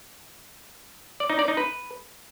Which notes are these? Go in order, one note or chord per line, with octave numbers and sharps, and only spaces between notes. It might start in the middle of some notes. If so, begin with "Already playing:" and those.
D5
D#4
D5
D#4
B4